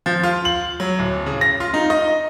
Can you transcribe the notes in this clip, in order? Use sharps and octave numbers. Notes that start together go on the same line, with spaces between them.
F3
F4
F#7
F#3
D1
C#3
A#6
F4
D#4
D#5